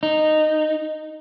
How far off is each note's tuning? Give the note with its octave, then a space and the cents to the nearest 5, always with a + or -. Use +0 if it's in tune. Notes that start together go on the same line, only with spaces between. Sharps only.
D#4 -10